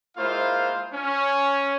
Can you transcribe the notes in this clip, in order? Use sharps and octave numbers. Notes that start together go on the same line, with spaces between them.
G#3 A#3 E4 F4 C5 F5
C#4